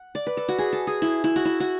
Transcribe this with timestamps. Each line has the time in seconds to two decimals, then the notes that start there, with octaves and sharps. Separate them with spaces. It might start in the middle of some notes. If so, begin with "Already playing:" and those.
Already playing: F#5
0.15 D5
0.27 B4
0.37 A4
0.49 F#4
0.58 G#4
0.73 A4
0.87 G#4
1.02 E4
1.24 E4
1.36 F#4
1.45 E4
1.60 F#4